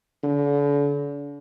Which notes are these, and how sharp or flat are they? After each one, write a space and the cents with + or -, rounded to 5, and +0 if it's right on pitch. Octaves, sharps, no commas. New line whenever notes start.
D3 -40